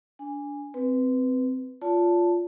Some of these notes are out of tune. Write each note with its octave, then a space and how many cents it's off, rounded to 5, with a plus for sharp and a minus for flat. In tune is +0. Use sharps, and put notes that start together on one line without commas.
D4 -20 G#5 -15
C4 -15 B4 +0
F4 +0 D5 -45 A5 +0